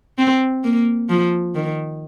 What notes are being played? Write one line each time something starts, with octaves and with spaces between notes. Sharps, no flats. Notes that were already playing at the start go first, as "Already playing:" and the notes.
C4
A#3
F3
D#3